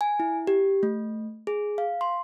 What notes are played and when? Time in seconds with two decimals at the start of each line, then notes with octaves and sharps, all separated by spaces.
0.01 G#5
0.20 E4
0.47 G4
0.83 A3
1.47 G#4
1.78 F5
2.01 C6